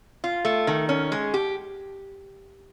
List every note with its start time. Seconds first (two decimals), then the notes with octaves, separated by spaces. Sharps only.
0.24 F4
0.45 A3
0.67 D#3
0.89 C#4
1.12 G#3
1.34 G4